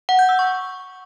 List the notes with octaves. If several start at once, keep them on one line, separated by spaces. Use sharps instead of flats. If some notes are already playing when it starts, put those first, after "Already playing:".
F#5
G6
E6
C#6